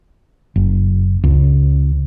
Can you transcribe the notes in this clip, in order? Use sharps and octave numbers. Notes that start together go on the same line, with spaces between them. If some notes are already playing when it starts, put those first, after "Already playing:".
F#1
C#2